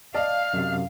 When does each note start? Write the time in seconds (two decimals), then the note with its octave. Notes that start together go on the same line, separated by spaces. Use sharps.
0.15 D5 D#5 F5 A5 F6
0.53 F#2 C3